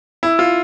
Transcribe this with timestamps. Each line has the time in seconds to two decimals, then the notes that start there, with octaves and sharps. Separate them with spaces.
0.23 E4
0.39 F4